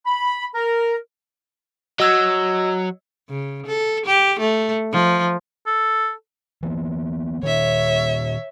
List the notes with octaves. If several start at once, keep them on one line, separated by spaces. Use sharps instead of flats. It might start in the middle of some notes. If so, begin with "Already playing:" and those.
B5
A#4
F#3 D#5 E6 G#6
C#3
A4
G4
A3
F3
A4
E3 A#3 B3
A#2 D#3 C#5 E5